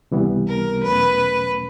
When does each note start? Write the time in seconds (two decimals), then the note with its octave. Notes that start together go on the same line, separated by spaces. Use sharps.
0.11 C#2 C3 E3 G3 B3
0.47 A#4
0.83 E2 B2 F#3 A3 C#4 B4